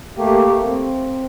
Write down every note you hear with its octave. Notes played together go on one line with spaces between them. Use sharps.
A3 A#3 G4
C4